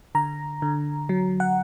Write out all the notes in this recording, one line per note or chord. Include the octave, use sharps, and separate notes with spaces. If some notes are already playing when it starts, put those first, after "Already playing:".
D3 A#5
D3
F#3
F#5